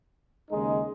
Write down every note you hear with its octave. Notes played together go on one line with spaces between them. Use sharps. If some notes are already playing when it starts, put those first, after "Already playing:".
D#2 C#3 G#3 D#4